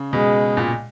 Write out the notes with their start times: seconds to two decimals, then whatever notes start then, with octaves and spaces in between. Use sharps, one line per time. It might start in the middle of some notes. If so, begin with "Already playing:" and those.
Already playing: C#3
0.13 B2 G#3
0.57 A#2